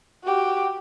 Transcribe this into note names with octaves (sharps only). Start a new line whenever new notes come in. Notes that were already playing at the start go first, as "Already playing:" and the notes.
F#4 G4